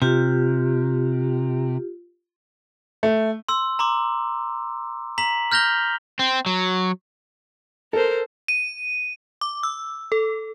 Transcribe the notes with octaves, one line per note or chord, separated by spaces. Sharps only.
C3 F4 G4
A3
C6 E6
A#5 C6 D6
A#5 B6 F#7
F6 G6 A#6 F7 G7
C4
F#3
A4 A#4 C5
D#7
D6
E6
A4